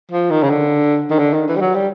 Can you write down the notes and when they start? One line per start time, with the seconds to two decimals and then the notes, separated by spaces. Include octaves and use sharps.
0.11 F3
0.30 D#3
0.43 C#3
0.50 D3
1.10 D#3
1.19 D3
1.33 D#3
1.48 E3
1.56 G3
1.61 F#3
1.75 G3